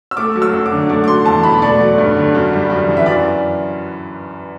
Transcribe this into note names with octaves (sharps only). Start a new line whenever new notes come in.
E6
A3 D6
F#3
E6
F#2
D6
D3
A3 D6
D6
F#3 C6
E2 A5
B2 B5
A3 D5
F#3
G2
D3
F#2
G3
F#2
E3
E5
F#2 D5